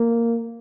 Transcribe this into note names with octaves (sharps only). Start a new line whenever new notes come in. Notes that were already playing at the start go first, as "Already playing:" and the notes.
Already playing: A#3